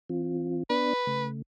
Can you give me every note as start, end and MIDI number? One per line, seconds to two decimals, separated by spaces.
0.10 0.63 52
0.10 0.63 60
0.10 0.63 65
0.70 0.93 59
0.70 0.93 62
0.70 1.26 71
0.70 0.93 74
1.07 1.42 49
1.07 1.42 57